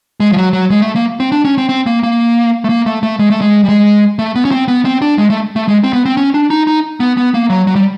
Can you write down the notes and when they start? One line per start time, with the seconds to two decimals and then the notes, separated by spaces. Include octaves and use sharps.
0.20 G#3
0.32 F3
0.37 F#3
0.53 F#3
0.70 G#3
0.82 A3
0.96 A#3
1.20 C4
1.32 D4
1.45 C#4
1.58 C4
1.69 C4
1.86 A#3
2.03 A#3
2.64 A3
2.69 A#3
2.86 A3
3.03 A3
3.19 G#3
3.30 A3
3.41 G#3
3.64 G3
3.69 G#3
4.19 A3
4.36 B3
4.45 C#4
4.51 C4
4.68 B3
4.85 C4
5.02 D4
5.18 G#3
5.30 A3
5.56 A3
5.68 G#3
5.84 C4
5.93 B3
6.05 C4
6.17 C#4
6.34 D4
6.50 D#4
6.67 D#4
7.00 B3
7.17 B3
7.34 A#3
7.50 F#3
7.67 F#3
7.75 G3